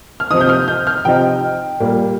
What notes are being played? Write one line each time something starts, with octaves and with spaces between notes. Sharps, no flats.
F6
C3 F3 C4 D#4 D#6
G6
F6
G6
F6
C3 F3 C4 D#4 G5
A#2 G3 A#3